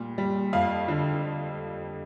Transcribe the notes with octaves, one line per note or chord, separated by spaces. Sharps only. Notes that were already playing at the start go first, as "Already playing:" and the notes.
Already playing: A#2 G3
G3
F2 F5
D3